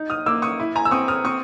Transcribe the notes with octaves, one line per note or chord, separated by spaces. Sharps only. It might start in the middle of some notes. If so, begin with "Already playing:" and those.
Already playing: D#4
D#6 F6
A#3 D6 E6
C#6 D#6
E4
G#5 A#5
E6
C4 C#6 D#6
D#6 F6
C4 C#6 D#6